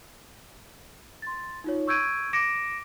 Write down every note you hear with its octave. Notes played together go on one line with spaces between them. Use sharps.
C6 A6
D#4 F4 C#5
C#6 E6 G6 G#6 D7 D#7
D6 A#6 C#7 D7 E7